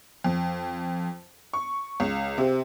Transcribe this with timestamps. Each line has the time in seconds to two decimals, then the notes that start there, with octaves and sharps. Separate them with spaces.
0.24 F2
1.53 C#6
2.00 C#2
2.38 C3